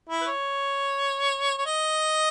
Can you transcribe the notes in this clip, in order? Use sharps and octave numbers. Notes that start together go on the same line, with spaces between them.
E4
B4
C#5
C#5
D#5